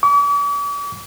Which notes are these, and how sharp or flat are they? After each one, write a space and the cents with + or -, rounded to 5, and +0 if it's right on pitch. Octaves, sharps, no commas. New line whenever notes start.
D6 -45